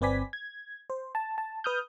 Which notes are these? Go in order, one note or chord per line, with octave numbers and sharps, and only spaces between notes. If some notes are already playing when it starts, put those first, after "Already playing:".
G1 C4 B4 D5 G#5 B6
G#6
C5
A5
A5
B4 D#6 F6 G6